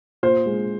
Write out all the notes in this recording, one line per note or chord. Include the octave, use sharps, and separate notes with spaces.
A#2 C5
G#3